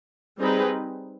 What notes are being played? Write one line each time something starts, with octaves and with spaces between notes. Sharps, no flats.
G3 C4 D#4 G#4 B4